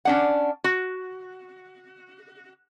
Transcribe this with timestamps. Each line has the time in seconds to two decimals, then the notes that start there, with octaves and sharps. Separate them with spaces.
0.05 C#4 D4 F#5
0.64 F#4